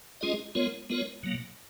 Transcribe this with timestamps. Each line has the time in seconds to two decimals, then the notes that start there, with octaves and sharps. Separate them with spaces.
0.21 G#3 C#4 F4 G#4 D#5
0.55 G#3 B3 F4 A#4 C#5
0.90 G#3 B3 F4 A#4 C#5
1.23 B2 F#3 A#3